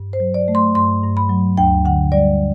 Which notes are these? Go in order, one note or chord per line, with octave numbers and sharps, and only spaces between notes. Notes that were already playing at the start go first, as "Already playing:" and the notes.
Already playing: G2
C5
F#3
D5
A3
C6
G2 C6
G2
B5
F#3
D2 G5
D3 F#5
G3 D5